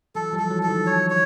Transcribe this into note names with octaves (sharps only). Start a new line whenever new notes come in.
E3 F#3 A4
F3 G3
A4
E3 F#3
A4
D#3 F3
C#5
C#5